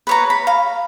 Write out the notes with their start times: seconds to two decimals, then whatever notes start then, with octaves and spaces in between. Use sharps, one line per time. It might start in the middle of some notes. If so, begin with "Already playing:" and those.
0.07 B4 C#5 A#5
0.30 B5
0.47 F5